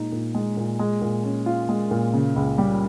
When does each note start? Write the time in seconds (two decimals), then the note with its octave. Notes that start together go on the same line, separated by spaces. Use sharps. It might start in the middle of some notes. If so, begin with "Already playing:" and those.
Already playing: A#2 G#3 D#4
0.12 A#2
0.34 G#3
0.57 A#2
0.79 G#3
1.01 A#2
1.24 C#4
1.46 F4
1.69 G#3
1.91 A#2
2.13 C#3
2.36 C#2
2.58 G3